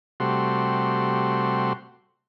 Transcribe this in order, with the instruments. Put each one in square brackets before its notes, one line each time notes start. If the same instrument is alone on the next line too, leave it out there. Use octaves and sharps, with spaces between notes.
[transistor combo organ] C3 G3 A3 F#4 C6